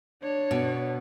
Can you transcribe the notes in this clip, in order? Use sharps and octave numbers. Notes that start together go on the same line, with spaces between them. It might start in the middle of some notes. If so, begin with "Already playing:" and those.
D4 C#5
B2